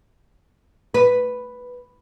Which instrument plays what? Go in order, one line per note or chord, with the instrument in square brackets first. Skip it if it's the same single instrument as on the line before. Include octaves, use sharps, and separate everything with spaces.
[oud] B4